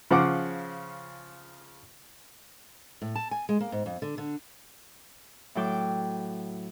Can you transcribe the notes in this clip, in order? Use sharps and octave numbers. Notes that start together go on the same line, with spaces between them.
C#3 F3 F#5 D6
A2
A5
G#5
G#3
A#3
G#2
F2
D3
D3
A2 F#3 A4 G5 D6